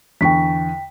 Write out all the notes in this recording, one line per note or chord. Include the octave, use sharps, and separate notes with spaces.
E2 D3 G5 C#6 B6